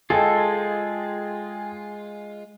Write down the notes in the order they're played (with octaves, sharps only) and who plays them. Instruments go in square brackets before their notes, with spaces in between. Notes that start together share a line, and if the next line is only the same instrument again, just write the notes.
[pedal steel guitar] G#3 F4 [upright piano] G#4 D#5 G5 [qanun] A4